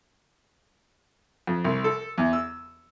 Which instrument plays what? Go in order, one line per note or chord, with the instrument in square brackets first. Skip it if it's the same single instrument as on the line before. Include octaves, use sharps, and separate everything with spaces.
[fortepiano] F2
C2
A4
E2
E6